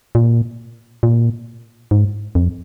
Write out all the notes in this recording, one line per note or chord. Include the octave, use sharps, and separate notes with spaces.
A#2
A#2
G#2
F2